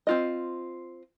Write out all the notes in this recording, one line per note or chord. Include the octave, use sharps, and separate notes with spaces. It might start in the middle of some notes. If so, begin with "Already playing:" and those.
C4 F4 D#5